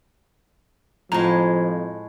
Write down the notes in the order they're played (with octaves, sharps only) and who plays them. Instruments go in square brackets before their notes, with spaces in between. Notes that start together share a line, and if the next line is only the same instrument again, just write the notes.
[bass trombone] F2 [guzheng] A2 G#3 [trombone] F3 [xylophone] A#5